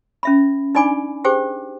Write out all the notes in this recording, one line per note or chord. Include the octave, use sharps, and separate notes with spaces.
C#4 E5 B5
D4 D#4 D5 G#5 B5 D6
G4 G#4 C5 G5 D6